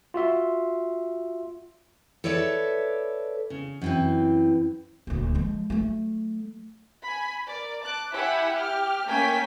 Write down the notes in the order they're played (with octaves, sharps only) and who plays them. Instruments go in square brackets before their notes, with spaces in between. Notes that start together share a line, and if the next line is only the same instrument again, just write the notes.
[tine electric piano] F4 F#4 E5 C6
[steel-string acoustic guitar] A4 B4 C#5 D5 E5
C#3
F#2 E3 C4
[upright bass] D#1 D2
F3 G#3
F#3 A3
[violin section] G#5 B5
A#4 D5
A5 D6 F#6
E4 G4 E5 F#5 G#5 B5
G4 F6
A3 A#3 C#4 G5 G#5 B6